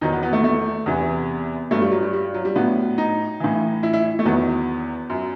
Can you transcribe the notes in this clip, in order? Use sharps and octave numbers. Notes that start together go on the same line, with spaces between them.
E2 D#3 F#3 D#4
B3
B3
A3
A3
E2 C3 E3 B3
G2 F#3 A3
G3
F#3
G3
G3
F#3
G3
A2 F#3 B3
D#4
A2 E3
E4
E4
A3
E2 D#3 F#3 B3
F#2 F#3